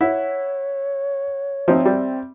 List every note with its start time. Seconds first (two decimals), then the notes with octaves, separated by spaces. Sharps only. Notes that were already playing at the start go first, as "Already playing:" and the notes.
0.01 E4 C#5 F#5
1.68 F3 C4 D#4 E5
1.85 G3